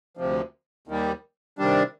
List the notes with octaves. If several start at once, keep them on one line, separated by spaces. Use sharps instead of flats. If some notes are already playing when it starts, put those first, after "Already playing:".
D2 C3 F3
D#2 D#3 G3
C3 D#3 G3 D4